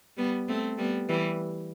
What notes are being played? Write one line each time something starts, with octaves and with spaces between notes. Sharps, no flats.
G3 B3
A3 C4
G3 B3
E3 G3